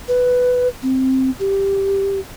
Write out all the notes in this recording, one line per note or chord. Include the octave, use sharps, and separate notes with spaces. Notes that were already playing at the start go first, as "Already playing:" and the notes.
B4
C4
G4